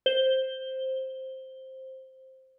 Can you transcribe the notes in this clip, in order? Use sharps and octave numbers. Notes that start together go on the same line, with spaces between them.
C5 G7